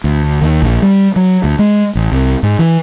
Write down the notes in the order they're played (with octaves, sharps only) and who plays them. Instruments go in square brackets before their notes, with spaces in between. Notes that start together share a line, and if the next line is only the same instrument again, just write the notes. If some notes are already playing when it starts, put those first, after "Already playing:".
[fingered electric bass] D2
D#2
A#1
G3
F#3
D2
G#3
A1
C2
G#2
E3